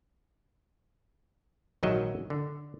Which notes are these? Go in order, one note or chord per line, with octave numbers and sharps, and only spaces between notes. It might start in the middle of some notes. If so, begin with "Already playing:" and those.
A#1 G#2 D#3 F#3 D#5 E5
D3